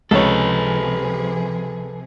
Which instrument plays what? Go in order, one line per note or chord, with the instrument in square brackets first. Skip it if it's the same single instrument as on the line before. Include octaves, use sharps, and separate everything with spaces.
[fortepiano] C#2 C#5 [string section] C3 F3 G#4 [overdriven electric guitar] A4 B4